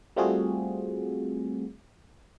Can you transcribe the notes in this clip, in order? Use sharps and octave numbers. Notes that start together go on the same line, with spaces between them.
G3 A3 C4 F4 F#4 G#4